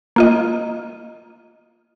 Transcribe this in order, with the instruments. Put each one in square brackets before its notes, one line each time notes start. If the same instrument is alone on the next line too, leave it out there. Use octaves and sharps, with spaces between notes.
[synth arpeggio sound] A#3 F4 D#5